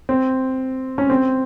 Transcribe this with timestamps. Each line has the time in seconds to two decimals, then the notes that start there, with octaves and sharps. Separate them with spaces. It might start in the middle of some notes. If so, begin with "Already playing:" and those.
0.09 C4
0.98 C#4
1.10 C4